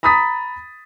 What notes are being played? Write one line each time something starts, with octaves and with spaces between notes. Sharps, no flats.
A#5 B5 D#6 A6 B6